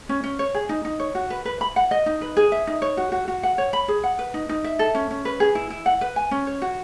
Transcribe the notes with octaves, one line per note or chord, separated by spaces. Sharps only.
C#4
C#4
C#5
G#4
D#4
D#4
C#5
F#4
B4
B4
B5
F#5
D#5
D#4
B4
G#4
E5
D#4
C#5
F#4
F#4
F#4
F#5
C#5
B5
G#4
F#5
B4
D#4
D#4
E5
A4
C#4
C#4
B4
G#4
E4
E4
F#5
B4
G#5
C#4
C#5
F#4